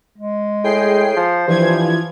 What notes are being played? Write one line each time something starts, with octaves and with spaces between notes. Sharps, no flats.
G#3
A2 G#4 G5 C7
F3 C5
G2 E3 F3 G#6